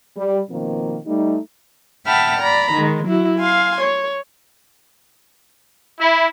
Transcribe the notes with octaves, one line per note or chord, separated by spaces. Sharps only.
G3
B2 D#3 F3 A#3 C4
G3 A3 D#4
E5 F#5 G5 A5 B5 F6
D5 A#5 B5
D#3 G#3
F#3 E4 F#4
F5 G#5 C6
C#5
E4